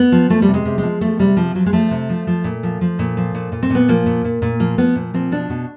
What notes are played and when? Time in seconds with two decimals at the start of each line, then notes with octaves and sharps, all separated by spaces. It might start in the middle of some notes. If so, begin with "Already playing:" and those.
Already playing: B3
0.12 F3
0.30 F3 A3
0.42 G3
0.48 C3
0.54 G#3
0.65 C3
0.78 F3 G#3
1.01 F3 A3
1.19 C3 G3
1.37 C3 F3
1.55 F3 F#3
1.66 G#3
1.73 F3 A3
1.91 C3
2.09 F3
2.27 F3
2.44 A#2
2.63 F3
2.81 F3
2.99 A#2
3.17 F3
3.35 A#2
3.52 A#2
3.63 C4
3.70 A#2
3.75 B3
3.88 F3 A#3
4.06 A#2
4.24 A#2
4.42 A#2
4.60 F3 A#3
4.78 F3 B3
4.96 A#2
5.14 F3 C4
5.32 B2 D4
5.50 B2